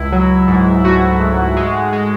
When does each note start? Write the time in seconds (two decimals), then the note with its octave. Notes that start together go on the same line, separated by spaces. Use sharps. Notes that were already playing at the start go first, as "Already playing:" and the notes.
Already playing: C#2 E4
0.12 F#3
0.48 G#2
0.84 A3 F#4
1.20 G#2
1.57 G#3
1.93 G#3